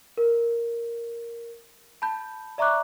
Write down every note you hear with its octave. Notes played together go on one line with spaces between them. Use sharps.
A#4
A5 B5 G6
D5 E5 A#5 C#6 D6 F#6